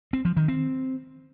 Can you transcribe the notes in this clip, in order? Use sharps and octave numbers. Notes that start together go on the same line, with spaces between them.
C4
F3
D#3
C4